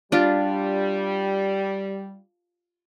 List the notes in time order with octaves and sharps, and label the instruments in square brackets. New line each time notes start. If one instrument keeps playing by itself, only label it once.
[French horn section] G3 [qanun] D4 F4 G4